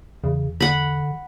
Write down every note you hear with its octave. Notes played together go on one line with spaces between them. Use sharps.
E2 C#3
D3 F#5 B5